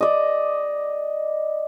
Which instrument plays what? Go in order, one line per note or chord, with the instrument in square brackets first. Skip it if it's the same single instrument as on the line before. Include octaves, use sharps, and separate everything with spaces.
[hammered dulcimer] D5 D#5